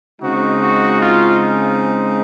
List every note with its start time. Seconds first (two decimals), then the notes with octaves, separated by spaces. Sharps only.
0.21 C#3 G#3 C4 D#4 F#4
0.60 F#4
1.00 F4